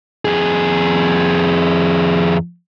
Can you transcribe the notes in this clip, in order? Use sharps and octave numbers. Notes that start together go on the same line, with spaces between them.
F2 G#4